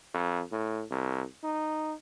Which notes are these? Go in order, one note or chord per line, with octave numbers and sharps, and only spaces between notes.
F2
A2
C2
D#4